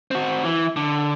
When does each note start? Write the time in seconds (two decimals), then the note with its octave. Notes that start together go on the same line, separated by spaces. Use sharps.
0.11 C4 F#4
0.44 E3
0.76 D3